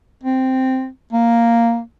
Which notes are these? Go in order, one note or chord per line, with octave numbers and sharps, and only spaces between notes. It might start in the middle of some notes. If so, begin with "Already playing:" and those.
C4
A#3